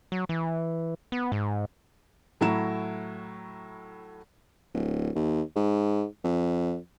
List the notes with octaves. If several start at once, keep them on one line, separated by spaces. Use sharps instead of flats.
F#3
E3
B3
G#2
A2 F#3 E4 A#5 E7
D1
D#2
G#2
F2